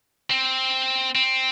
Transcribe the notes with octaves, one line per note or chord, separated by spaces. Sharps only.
C4
C4